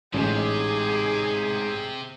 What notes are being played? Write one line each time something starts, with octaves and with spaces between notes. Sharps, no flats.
A1 G#2 C3 G#4